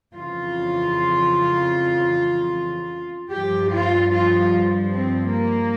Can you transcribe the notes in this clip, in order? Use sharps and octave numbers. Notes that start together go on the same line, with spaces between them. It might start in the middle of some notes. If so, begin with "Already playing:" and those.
F2 C#3 E3 F4
G2 F3 G4
F4
F4
C4
A#3